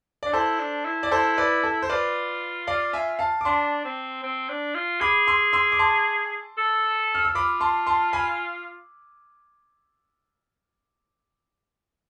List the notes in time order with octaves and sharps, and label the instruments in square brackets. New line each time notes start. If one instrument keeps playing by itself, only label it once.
[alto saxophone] D4 [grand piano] D5
[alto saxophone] E4 [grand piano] A4 C5
[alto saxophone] D4
E4
[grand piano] D5
[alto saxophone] E4 [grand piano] A4 C5
[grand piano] B4 D5
A4
C5
[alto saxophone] F4 [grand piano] B4 D5
[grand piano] D5 F5
E5 G#5
F5 A5
D6
[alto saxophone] D4 [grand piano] A5 C6
[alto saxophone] C4
C4
D4
F4
[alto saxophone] G#4 [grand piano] B5 D6
[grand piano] C6 E6
C6 E6
D6
A5 C6
[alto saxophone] A4
[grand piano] F6
E6
[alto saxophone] F4 [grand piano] B5 D6
[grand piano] A5 C6
A5 C6
G#5 B5